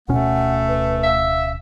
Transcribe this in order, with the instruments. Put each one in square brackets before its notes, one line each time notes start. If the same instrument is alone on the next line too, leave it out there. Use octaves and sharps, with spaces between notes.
[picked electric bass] D1 B2 C#4 [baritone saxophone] A3 [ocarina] F#5
[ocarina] B4
[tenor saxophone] E5 [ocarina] F5